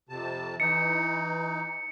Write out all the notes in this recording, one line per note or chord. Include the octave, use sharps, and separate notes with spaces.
F2 C3 A5
E3 D#4 C#7